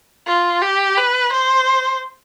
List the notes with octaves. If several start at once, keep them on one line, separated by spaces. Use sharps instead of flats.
F4
G4
B4
C5